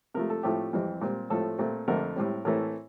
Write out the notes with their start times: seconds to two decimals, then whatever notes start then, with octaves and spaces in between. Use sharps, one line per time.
0.14 C3 F3 A3 A#4
0.30 A4
0.43 A2 F3 A3 C4 G4
0.73 F2 E3 G3 C4
1.01 A#2 G3 C4
1.30 A2 F3 A3 C4 A4
1.59 A#2 A3 C4
1.88 F2 D3 A3 C4 A#4
2.16 A2 G3 C4
2.45 A2 E3 A3 C4 A#4